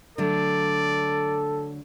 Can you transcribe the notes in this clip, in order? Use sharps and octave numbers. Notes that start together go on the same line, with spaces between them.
D3 F#3 A3 A4 D5